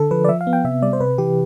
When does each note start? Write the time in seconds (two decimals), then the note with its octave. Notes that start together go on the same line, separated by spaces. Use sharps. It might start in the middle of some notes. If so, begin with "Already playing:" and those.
Already playing: D3 A4
0.11 F3 B4
0.24 D5
0.29 F3 E5
0.41 F5
0.47 B3
0.53 G5
0.64 C3 E5
0.82 G3 D5
0.93 C5
1.00 C3 B4
1.18 E3 G4